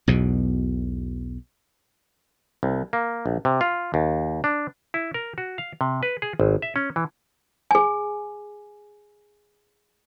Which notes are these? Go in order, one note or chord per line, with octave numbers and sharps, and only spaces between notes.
B1 E2 B2
C2
A#3
A#1
C3
F4
D#2
D4
E4
A#4
F#4
F5
C3
B4
G#4
G#1
E5
C#4
E3
G#4 G#5